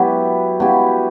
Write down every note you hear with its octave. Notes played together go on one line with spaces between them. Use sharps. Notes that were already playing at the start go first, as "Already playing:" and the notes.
Already playing: F#3 B3 E4 G4
F#3 B3 E4 G4